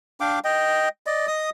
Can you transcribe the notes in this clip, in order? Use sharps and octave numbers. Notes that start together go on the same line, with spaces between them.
D4 F5 G5 D6
D#5 G5
D5 D#5
D#5 D#6